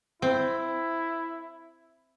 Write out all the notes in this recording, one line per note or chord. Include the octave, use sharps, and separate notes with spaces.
C4 E4